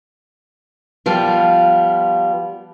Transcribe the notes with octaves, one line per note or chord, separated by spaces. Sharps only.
F3 G3 B3 F4